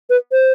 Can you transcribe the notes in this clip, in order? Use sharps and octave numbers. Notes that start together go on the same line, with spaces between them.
B4
C5